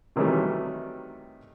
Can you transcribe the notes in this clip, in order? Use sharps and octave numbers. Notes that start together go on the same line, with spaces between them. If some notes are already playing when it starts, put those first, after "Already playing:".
C3 D#3 E3 F#3 G3 A3